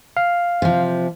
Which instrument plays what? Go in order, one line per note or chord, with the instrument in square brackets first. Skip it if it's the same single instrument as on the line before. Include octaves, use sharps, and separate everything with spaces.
[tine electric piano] F5
[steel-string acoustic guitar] C3 F3